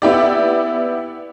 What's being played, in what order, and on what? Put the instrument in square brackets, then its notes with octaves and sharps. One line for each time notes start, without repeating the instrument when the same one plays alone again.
[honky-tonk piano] B3 E4 G4 D5